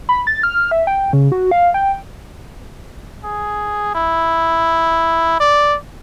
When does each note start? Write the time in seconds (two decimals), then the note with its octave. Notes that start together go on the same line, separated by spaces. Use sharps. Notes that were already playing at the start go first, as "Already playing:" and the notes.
0.09 B5
0.27 A6
0.43 F6
0.71 E5
0.87 G5
1.13 C#3
1.32 F#4
1.51 F5
1.74 G5
3.24 G#4
3.95 E4
5.40 D5